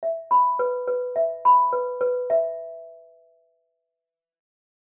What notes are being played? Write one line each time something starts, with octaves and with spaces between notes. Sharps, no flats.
E5
B5
B4
B4
E5
B5
B4
B4
E5